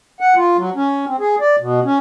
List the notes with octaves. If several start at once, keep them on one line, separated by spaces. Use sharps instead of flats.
F#5
F4
F#3
C#4
C4
G#4
D5
B2
C#4